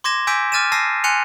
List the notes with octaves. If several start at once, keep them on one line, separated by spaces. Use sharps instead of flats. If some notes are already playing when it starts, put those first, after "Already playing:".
C6 D6 G#6 A#6 E7
G#5 D6 E6 G6 B6 D7
D6 F6 A6 D#7 E7
A5 E6 A#6 C7 D#7
G#5 C6 F#6 C#7 D#7 F7